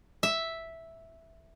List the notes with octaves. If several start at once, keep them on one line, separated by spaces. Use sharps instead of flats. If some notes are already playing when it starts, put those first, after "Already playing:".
E5